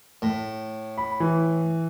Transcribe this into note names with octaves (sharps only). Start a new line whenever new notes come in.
A2
B5
E3